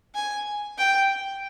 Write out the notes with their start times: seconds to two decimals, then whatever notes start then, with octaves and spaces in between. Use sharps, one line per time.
0.15 G#5
0.79 G5